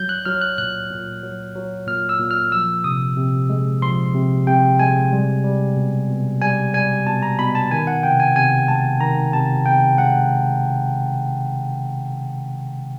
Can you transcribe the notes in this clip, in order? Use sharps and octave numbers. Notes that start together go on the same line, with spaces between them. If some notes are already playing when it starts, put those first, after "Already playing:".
Already playing: F#3 G6
F#6
F#3 F6
F#6
A#2 F#6
A#2
F#3
F#3
A#2 F6
E6
A#2
F6
F3 E6
C3 D#6
C3
G#3
F3 C6
C3
C3 G5
G#3 G#5
G3
G3
B2
B2
G3 G#5
G3 G#5
B2 A5
A#5
B2 B5
A5
D#3 G#5
F#5
C3 G5
G#5
C3 G#5
G#3 A5
D#3 A#5
C3 A5
C3 G5
G#3 F#5